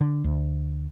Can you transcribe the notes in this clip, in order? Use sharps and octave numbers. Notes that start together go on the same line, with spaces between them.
D3
D2